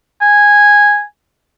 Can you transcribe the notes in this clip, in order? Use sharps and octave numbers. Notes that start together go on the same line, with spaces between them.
G#5